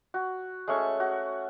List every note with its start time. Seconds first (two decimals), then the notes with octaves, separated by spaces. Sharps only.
0.14 F#4
0.68 G#3 A3 C#4 C#6
1.00 F#4